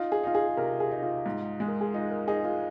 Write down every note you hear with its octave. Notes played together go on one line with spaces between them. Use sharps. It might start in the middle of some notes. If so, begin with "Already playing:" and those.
Already playing: D#4 F4
G#4
D#4 F4
G#4
C3 A#4
G#4
D#4
F4
G#2
G#3
A#4
G#4
D#4 F4
A#4
D#4 G#4
F4